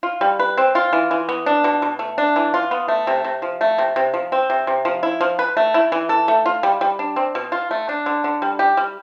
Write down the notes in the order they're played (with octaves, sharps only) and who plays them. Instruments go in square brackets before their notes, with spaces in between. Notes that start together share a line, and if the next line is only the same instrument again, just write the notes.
[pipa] F4
G3
B4
C4
F4
E3
E3
B3
D4
B2
B2
A3
D4
E3
F4
B3
A3
C3
C3
F3
A3
C3
C3
F3
C4
C3
C3
F3
E4
F3
B4
A3
E4
E3
A4
A3
F4
G3
G3
D4
C4
B2
F4
A3
D4
D3
D3
G3
G4
G3